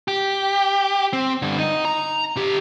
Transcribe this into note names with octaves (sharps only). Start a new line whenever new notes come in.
G4
C4
G2 D3
D#4
A#5
D3 G4